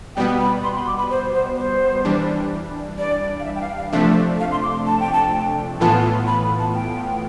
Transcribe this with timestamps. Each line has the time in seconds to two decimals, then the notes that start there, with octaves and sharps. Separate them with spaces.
0.16 B2 G3 B3 G5
0.39 B5
0.64 C6
0.75 B5
0.87 D6
0.98 B5
1.10 C5
1.33 C5
1.57 C5
2.05 E3 G3 D4
2.98 D5
3.40 F5
3.45 E5
3.55 G5
3.61 F5
3.77 F5
3.92 C3 F3 A3 D4 E5
4.40 F5
4.52 C6
4.63 D6
4.86 A5
5.00 G5
5.13 A5
5.33 G5
5.80 A2 E3 B3 F4 A5
6.27 B5
6.44 B5
6.59 A5
6.75 G5